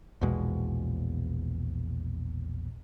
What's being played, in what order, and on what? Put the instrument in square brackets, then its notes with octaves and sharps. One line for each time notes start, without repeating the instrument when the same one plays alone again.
[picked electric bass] A#1 E2 B2 G#3